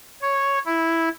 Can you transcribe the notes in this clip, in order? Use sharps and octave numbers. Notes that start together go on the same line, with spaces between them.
C#5
E4